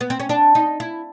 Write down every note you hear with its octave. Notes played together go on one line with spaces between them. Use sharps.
B3
C4
C#4
D4
D#4
E4